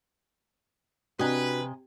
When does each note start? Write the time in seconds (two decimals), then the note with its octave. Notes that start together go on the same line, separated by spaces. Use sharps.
1.19 C3 D4 F#4 B4 D#5 G#5 A#5